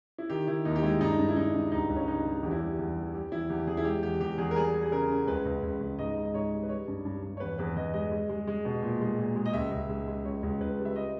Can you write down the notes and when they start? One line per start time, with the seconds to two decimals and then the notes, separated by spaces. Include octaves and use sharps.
0.18 E4
0.30 D#3 G4
0.47 D#3 E4
0.65 D#2 D#4
0.76 G4
0.83 G#3 E4
1.00 G2 D#4
1.19 G2
1.29 E4
1.36 G2 D#4
1.54 G2
1.72 C#2 D#4
1.89 C#2
1.96 C#4
2.08 G3 D#4
2.25 G3
2.43 E2 G4
2.51 E4
2.59 G3 G4
2.79 E2
2.96 G3
3.14 G3 G4
3.32 E2 E4
3.50 E2 G4
3.67 E2 G#4
3.77 E4
3.85 G#3 G4
4.03 E2 G4
4.21 E2 G4
4.38 E2 G#4
4.51 A#4
4.56 G3 G#4
4.74 G3
4.83 G#4
4.91 C#3 A#4
5.09 C#3
5.27 C#2 B4
5.45 C#2
5.63 C#2
5.80 C#2
5.99 G#2 D#5
6.16 G#2
6.25 D#5
6.34 G#2 C#5
6.52 G3
6.63 B4
6.69 G3 C#5
6.88 G2
7.05 G2
7.23 G2
7.37 C#5
7.40 E2 B4
7.58 E2 B4
7.76 E2 D#5
7.94 G#3 D#5
8.12 G#3
8.29 G#3
8.47 G#3
8.65 B2
8.82 A#2
9.01 G#3
9.19 A#2
9.36 G#3
9.46 D#5
9.53 C#2 E5
9.71 C#2
9.89 G#3
10.08 G#3
10.25 C#2 C#5
10.43 C#2
10.61 C#2 B4
10.79 G3
10.85 E5
10.96 D#5